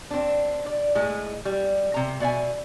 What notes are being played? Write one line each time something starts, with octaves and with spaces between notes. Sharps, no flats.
C4 D4
D5
A2 G#3
G3
C3 A#5
B2 D5 E5 G#5